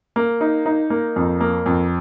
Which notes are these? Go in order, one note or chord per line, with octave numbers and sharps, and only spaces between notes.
A#3
D#4
D#4
A#3
F2
A#3
F2